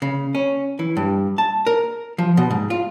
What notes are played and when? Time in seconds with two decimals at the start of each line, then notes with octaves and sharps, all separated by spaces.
0.02 C#3
0.35 C#4
0.79 E3
0.97 G2
1.38 A5
1.66 A#4
2.18 F3
2.37 B2
2.50 G#2
2.70 F4